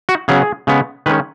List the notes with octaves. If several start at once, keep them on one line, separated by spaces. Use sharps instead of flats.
F#4
C#3 F#3 B3 G#4
C#3 G#3 B3
D#3 G#3 C#4 B4